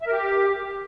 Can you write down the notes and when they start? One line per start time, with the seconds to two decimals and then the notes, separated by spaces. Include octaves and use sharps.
0.02 E5
0.07 A#4
0.12 G4